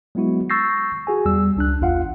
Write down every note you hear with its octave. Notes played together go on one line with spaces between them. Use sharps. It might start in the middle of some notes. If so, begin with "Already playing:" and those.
F#3 G#3 B3 E4 F#4
C#6 E6 G6 A6 A#6 C7
F#4 G#4 G#5
E2 G3 E6
C#2 D4 F#6
A1 E2 F4 F5 F#5